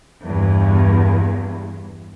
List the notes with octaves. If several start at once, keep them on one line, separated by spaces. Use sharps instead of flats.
E2 G2